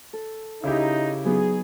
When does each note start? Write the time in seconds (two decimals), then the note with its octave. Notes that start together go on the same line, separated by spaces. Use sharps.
0.13 A4
0.64 C#3 D#4 E4 G4
1.25 F#3 B3 D#4 G#4